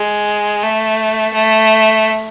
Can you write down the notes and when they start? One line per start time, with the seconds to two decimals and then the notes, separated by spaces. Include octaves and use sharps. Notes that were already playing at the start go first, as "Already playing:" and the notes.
Already playing: G#3
0.63 A3
1.33 A3